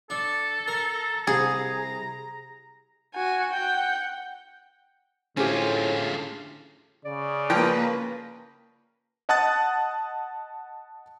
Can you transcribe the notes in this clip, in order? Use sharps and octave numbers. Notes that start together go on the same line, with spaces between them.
D4 A4
A#4 A#5
C2 G#4 A#5
F#4 G#5
F#5 G5
A2 D3 C#4 F4 G4 G#4 C5
C#3 D5
F3 A#3 B4 G5
D#5 F#5 A5 D#6 F#6 A6